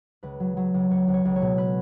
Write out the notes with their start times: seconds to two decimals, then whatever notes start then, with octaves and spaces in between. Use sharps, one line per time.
0.23 C#2 B4
0.40 F#3
0.57 F#3
0.74 C#2
0.90 C#2 C#5
1.08 C#2
1.14 C#5
1.25 C#2
1.36 C#5
1.42 B2
1.58 B4